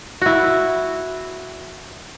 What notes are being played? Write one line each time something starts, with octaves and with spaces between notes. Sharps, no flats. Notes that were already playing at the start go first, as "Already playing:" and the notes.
E4 F#4